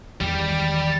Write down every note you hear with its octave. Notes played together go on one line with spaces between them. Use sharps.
E2 D#3 G3 G4